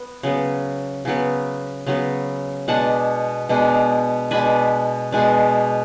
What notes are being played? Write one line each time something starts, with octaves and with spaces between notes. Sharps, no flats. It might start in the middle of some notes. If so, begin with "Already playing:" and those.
Already playing: B3
C#3 F#3 B3
C#3 F#3 B3
C#3 F#3 B3
B2 G#3 D4 F#5 A5
B2 G#3 D4
B2 G#3 D4 G#5 B5
B2 G#3 D4